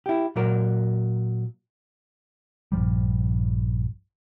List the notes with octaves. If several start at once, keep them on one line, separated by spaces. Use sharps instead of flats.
E4 G4
A#2 F#3 A#4
A#1 G2 F3 G3